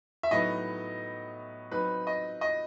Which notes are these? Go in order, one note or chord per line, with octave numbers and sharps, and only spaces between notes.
E5
A2 F#3 B3 D#4 D#5
F#3 C4 D#4 B4
D#5
D#5